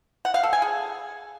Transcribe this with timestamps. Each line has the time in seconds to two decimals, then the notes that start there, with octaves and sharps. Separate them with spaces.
0.25 F#5
0.34 F5
0.43 A4
0.53 G#5
0.62 G#4